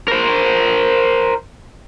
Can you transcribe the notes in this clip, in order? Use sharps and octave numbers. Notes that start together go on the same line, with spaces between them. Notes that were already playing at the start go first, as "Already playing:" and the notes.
A#4 C5